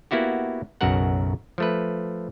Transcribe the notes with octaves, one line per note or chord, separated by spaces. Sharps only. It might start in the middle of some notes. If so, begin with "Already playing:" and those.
A#3 B3 E4 F#4 G4
B1 F#2 C#3 F#4 A#4 F#5
F3 A3 B4